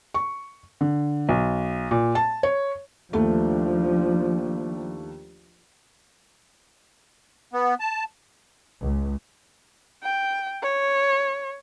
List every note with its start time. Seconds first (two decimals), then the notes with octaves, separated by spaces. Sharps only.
0.14 C#6
0.81 D3
1.29 B1
1.91 A#2
2.15 A5
2.43 C#5
3.13 D#2 F3 A3 D4
7.53 B3
7.80 A5
8.81 C#2
10.03 G5
10.62 C#5